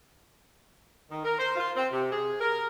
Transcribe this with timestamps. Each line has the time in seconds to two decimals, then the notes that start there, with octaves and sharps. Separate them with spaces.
1.10 D#3
1.24 A#4
1.38 C5
1.56 F4
1.76 C4
1.91 C3
2.11 G#4
2.40 A#4